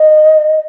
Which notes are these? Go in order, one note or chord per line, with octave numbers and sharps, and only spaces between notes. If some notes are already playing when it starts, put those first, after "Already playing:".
Already playing: D#5